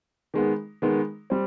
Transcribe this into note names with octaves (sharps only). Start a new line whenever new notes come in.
D#3 G#3 B3
D#3 G#3 B3
G3 C4